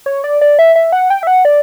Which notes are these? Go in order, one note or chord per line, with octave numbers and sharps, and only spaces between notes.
C#5
D5
D5
E5
E5
F#5
G5
E5
F#5
D5